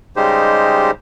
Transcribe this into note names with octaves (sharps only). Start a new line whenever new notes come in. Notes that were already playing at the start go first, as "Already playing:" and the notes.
C#3 G3 G#3 D#4 G4 C5